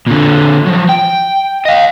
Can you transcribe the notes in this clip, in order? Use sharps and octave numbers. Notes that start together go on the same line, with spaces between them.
A#2 D3
F3 F#3
G5
D#5 F5